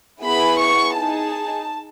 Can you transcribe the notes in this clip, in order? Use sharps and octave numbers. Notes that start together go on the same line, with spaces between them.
B3 E4 G#4 B5
C#6
D#4 G#4 A5